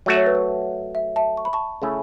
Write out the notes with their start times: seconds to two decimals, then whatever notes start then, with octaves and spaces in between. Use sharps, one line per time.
0.06 F#3 A3 F#4 E5
0.17 C#5
0.26 B4
0.35 C#5
0.95 E5
1.16 E5 A5
1.37 C#6
1.45 B5
1.53 A5 C#6
1.82 C#3 A3 C#4 E4